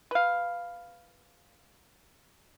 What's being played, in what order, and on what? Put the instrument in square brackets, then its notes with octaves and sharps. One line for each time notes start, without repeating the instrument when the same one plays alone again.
[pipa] B4 F5